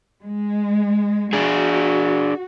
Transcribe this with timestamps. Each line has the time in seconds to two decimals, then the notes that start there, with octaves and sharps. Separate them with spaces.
0.24 G#3
1.33 D4 F#4 G#4